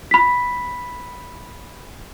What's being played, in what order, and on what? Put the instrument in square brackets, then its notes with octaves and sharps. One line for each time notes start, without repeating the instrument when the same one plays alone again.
[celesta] B5 B6